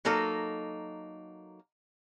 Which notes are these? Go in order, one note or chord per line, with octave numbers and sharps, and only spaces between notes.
F#3 A#3 D#4 A4